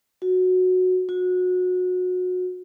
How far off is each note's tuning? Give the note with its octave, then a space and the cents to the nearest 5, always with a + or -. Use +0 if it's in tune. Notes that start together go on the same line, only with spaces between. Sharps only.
F#4 -10
F#4 -25